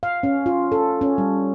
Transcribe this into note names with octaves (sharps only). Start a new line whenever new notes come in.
F5
C#4
F4
A4
C#4
G3